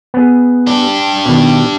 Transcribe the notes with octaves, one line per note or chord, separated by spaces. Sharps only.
B3 G#4
D4 G4
B2 D#3